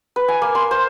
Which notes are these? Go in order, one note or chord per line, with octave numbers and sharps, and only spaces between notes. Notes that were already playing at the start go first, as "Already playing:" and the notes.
B4
G#5
A#3
C6
C5